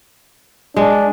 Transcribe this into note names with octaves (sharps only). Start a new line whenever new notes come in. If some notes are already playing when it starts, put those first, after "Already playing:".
G#3 D4